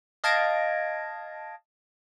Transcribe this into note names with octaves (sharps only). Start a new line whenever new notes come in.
D#5 F5 A5 G#6 A#6 D7